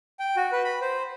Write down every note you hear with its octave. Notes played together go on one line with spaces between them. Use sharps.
G5
F#4
B4
B5
C5